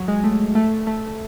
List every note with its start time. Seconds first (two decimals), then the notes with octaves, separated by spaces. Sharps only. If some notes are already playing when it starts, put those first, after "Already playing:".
Already playing: F#3
0.08 G#3
0.24 A3
0.55 A3
0.87 A3